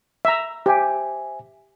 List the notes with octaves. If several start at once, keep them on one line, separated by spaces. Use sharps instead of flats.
E5 A#5
G4 C5 E5 G#5